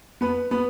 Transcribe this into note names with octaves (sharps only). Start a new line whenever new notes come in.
B3 B4
B3 B4